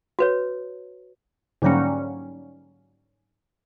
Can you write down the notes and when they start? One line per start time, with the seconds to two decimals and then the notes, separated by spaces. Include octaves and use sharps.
0.19 F#4 B4 C#5
1.62 G#2 D3 F#3 G3 A#3 C#4